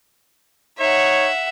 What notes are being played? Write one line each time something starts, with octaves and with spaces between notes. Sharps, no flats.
D#4 C#5 E5 F#5